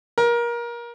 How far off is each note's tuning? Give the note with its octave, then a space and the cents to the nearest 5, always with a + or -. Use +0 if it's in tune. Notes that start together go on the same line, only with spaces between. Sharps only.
A#4 +25